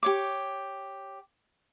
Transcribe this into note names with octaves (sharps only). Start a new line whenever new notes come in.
G4 C#5 D6